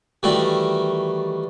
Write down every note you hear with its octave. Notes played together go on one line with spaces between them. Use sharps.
D#3 E3 G3 A3 F#4